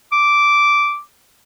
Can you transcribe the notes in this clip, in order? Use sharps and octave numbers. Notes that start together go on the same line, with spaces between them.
D6